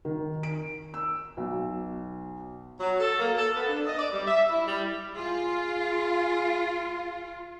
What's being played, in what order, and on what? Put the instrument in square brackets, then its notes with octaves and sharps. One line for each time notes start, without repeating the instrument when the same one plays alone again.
[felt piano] D#3
D7
E6
B1
[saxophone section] F#3
A4
A#3
A4
B3
D4
D#5
D5
G3
E5
E4
G3
[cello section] F4 [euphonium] G#4